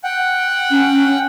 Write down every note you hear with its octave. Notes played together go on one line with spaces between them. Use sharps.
F#5 G5
C#4